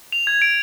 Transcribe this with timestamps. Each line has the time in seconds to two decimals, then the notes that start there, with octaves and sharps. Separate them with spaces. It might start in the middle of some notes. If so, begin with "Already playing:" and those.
0.12 F7
0.27 G#6
0.42 D7